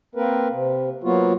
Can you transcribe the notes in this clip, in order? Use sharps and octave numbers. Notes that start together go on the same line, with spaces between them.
A#3 C4 A#4 B4
C3
F#3 A#3 B3 F4 F#4